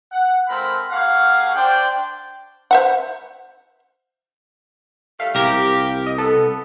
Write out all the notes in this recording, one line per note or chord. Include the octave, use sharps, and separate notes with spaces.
F#5
G#3 C4 F4 A4 A#4 B5
A#3 G4 G#4 C#5 F5 F#5
D4 C5 D5 G5
C5 E5 F#5
A2 G3 A3 F5
C2 G4 A#4
D#5
B3 A4